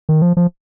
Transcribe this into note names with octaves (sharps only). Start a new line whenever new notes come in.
D#3
F3
F3